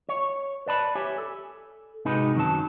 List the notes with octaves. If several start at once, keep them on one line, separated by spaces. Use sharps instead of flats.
C#5
B4 D5 A5 B5
G4 C#5 E5 G#5
A4
G#2 C3 D#4 F#4 G#4 B4
F#2 D#3 F#3 A5